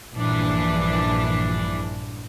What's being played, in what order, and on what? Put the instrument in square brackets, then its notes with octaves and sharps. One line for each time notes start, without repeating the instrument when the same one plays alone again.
[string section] A#1 G2 E3 D4